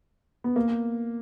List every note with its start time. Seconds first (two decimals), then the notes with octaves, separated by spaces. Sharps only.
0.44 B3
0.56 A#3